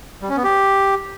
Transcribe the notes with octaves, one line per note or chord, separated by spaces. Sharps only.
G3
C#4
B3
G4